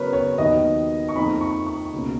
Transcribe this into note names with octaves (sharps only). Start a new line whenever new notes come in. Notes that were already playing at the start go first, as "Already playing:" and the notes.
Already playing: C#3 F#3 B3 A#4 B4 C#5
C#5
D#2 D#3 F#3 B3 D#5
C#6
F2 F3 A#3 D#4 B5
C#6
C#6
C#2 B2 A#3 C#4